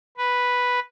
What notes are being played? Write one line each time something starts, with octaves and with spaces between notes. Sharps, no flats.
B4